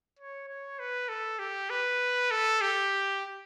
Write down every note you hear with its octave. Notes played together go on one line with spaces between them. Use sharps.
C#5
C#5
B4
A4
G4
B4
A4
G4